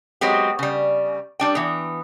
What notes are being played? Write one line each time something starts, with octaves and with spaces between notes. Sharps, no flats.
F#3 G#3 B3 C4 G4
C#3 G3
G3 D4 G5
E3 B3